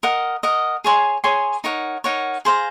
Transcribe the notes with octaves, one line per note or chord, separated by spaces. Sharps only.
A#4 D#5 F#5
A#4 D#5 F#5
G#4 C#5 G#5 C6
G#4 C#5 G#5 C6
D#4 A#4 C#5 F#5
D#4 A#4 C#5 F#5
G#4 C5 F5 A#5